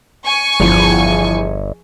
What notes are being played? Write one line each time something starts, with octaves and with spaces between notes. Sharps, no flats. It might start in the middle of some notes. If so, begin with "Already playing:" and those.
G#5 C#6
G1 E2 F3